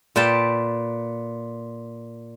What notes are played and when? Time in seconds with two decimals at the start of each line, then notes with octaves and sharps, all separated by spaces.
0.16 A#2 B4 G5 A5